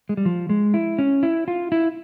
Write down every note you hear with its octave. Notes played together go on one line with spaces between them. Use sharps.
G#3
G3
F3
G#3
E4
C#4
E4
F4
E4